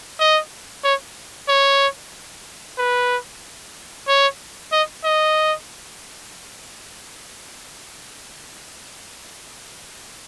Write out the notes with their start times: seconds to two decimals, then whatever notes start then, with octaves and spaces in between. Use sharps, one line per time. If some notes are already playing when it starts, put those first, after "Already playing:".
0.20 D#5
0.84 C#5
1.48 C#5
2.78 B4
4.08 C#5
4.72 D#5
5.04 D#5